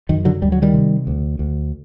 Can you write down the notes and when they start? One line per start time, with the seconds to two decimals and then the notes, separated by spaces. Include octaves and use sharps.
0.09 F#2 D#3
0.25 D3 F#3
0.42 D2 G3
0.52 F#3
0.62 D#3 G3
0.74 C3
1.07 D2
1.39 D2